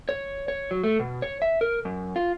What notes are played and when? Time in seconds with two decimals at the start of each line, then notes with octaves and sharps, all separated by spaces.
0.09 C#5
0.48 C#5
0.71 F#3
0.84 A3
1.00 B2
1.22 C#5
1.42 E5
1.61 A#4
1.85 F#2
2.16 F4